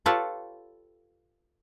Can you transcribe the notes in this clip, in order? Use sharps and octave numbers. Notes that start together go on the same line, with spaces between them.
F4 G4 A4 B4 C#5 A5